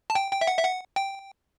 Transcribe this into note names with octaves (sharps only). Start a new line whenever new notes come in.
A5
G5
G5
E5
F#5
E5
F#5
G5